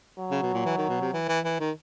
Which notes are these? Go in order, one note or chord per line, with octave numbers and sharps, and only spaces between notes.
F#3
C#3
B2
A#2
E3
D#3
B2
C3
E3
E3
E3
D#3